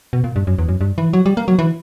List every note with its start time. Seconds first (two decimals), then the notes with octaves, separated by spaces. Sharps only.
0.13 B2
0.24 A#2
0.36 G2
0.47 F#2
0.59 E2
0.69 F#2
0.81 G2
0.98 E3
1.13 F#3
1.26 G3
1.37 A#3
1.48 F#3
1.59 E3